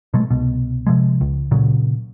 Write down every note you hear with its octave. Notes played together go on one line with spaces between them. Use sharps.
B2 F#3 G#3 A3
C2 B2
C3 F3 G#3
C#2
A#2 C#3 F#3